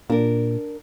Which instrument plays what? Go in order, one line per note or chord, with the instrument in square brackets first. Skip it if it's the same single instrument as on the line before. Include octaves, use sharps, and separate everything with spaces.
[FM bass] A#2 [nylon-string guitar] D4 A#4